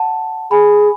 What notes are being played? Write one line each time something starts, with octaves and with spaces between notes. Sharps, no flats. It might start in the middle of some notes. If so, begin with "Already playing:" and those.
Already playing: F#5 A5
G#4 G#5 B5